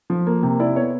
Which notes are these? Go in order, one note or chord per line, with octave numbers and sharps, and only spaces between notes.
F3
A#3
C3
E4 D5
B3 C#5